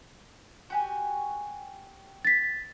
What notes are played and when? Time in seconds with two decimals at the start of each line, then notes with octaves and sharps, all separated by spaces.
0.70 F#4 G4 G#5
2.25 A6 B6